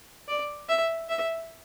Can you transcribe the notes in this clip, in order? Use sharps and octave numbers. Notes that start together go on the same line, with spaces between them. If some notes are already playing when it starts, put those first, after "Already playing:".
D5
E5
E5